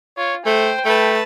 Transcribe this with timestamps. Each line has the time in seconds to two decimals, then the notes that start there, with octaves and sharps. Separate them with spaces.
0.18 F4 C#5
0.46 A3 C5 G5
0.86 A3 B4 A5